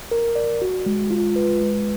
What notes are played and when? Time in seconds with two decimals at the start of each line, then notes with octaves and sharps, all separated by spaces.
0.11 A#4
0.36 D5
0.62 F#4
0.86 G#3
1.11 F4
1.36 B4
1.61 G#3